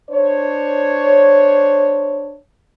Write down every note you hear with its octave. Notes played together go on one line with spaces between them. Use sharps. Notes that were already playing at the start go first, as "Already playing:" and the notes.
D4 C5 C#5